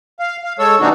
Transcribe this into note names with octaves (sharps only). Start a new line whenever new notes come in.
F5
F5
G#3 A4 C#5 E6
C3 E3 A#3 D4 D#4 F#4